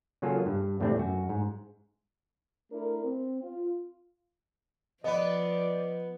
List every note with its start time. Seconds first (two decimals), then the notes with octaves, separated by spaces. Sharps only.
0.22 C#3 F#3 A#3 F4 G#4 A4
0.46 G2
0.80 E2 A2 C3 A3 C4 D4
0.98 F#2 F#4
1.29 G#2
2.72 A3 D4 E4 A#4
3.04 C4
3.42 F4
5.04 F3 B3 B4 D5 D#5